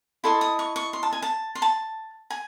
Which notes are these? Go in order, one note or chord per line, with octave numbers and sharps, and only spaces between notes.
E4 A4 D#5 C6
D#6
C#6
C#6
C6
A5
G#5
A5
C6
A5
G#5